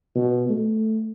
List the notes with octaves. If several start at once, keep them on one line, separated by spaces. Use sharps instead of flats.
B2
A3